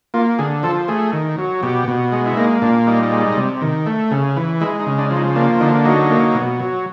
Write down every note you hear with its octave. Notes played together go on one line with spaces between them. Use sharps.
A#3 F4
D3 G#4
F3 A4
A3 G#4
D#3
F#3
B2 G4
B2
G#3
E4
A#3 D#4
A#2 D4
G3 D#4
G#3
C3
D#3
A3
C#3
E3
G#3 E4
D#4
C#3
D4
F3
D#4
A#3 D4
D3 D#4
F#3 D#4
A#3
B2
F#3